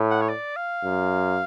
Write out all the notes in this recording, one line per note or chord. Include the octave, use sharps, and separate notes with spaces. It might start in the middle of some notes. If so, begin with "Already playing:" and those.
Already playing: A2
F#5
C#5
D5
F5
F#2